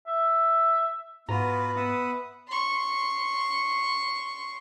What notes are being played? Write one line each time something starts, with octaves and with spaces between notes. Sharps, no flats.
E5
G#2 B3 F4 F#4 B4 A#5
B3 E5 F#5 D#6
C6 C#6